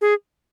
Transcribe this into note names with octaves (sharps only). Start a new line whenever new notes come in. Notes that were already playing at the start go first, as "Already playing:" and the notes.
G#4